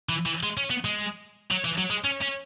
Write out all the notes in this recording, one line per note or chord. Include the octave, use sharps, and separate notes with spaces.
E3
E3
G#3
C#4
B3
G#3
F#3
E3
F#3
G#3
C#4
C#4